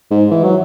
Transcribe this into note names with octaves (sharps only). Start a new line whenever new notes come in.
G#2
E3
F#3